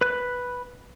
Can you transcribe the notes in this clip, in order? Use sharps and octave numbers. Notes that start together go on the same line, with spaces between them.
B4 F#6